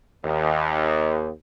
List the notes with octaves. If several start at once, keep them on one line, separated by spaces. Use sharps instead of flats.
D#2